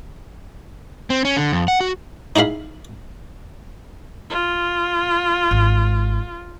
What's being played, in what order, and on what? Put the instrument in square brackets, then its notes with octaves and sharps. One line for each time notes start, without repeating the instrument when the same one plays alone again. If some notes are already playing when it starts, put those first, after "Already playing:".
[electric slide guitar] C4
C#4
D3
F2
F#5
F#4
[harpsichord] D#4 E4 G#4 F5 B5
[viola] F4
[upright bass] G#1